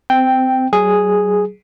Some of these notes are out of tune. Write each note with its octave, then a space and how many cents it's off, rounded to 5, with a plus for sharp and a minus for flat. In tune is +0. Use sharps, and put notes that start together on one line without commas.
C4 -20 G5 +0
F#3 +35 G#4 +0